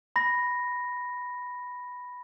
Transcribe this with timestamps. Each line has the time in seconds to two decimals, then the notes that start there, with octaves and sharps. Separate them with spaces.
0.16 B5 A#6